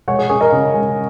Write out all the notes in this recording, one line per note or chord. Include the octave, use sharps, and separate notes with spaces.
G#3 C#5 F#5
G#4 C#5
C#4 G#4 C#5
A#4 D#5
C#3
G#3